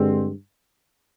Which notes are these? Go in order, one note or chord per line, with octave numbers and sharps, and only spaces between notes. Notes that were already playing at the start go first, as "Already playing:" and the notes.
Already playing: G2 D3 G#3 C4